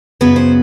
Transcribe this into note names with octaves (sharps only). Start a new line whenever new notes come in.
F#2 C#3 F#3 B3 B4
C5